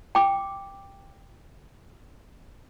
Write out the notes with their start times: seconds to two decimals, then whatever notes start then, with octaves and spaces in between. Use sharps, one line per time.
0.15 G5 D6